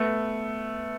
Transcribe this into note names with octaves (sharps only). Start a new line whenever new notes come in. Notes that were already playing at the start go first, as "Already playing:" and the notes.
Already playing: A3 B3